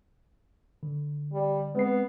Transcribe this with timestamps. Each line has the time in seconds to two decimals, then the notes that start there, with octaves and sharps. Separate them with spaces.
0.83 D3
1.33 G3
1.75 G#3 B3 C4 C7